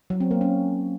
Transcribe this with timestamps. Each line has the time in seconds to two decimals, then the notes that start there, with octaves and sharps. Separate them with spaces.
0.10 F#3
0.20 C4
0.31 A#3
0.41 C#4